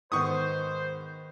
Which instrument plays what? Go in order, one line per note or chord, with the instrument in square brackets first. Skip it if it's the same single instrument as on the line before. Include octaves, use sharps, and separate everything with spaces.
[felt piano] G#2 [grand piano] D#3 B3 [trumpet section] C5 [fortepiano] C#6 D#6